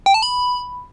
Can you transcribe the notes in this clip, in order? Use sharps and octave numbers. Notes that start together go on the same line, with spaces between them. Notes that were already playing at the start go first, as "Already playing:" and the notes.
G5
A5
B5